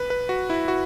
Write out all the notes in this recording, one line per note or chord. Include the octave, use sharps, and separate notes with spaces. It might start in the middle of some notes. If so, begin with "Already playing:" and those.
Already playing: B4
B4
F#4
E4
F#4